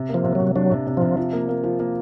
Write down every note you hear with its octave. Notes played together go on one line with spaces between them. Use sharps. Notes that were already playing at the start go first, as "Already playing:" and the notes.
Already playing: C3
A#3
F3
C3
C3 F#3
F#3 D4
C3
C3
C3 F3
F3
A#3
A#3
F3
A#3